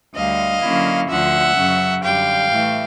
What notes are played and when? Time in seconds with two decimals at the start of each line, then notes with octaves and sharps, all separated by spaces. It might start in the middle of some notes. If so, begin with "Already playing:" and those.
0.14 D2 D3 G3 D#5 F5
0.62 D3 F#3 A#3 C#4 E4
1.08 D2 D3 F3 E5 F#5
1.56 F#2 C#3 F#3
2.02 F#2 D3 G3 F5 G5
2.49 A2 E3 A3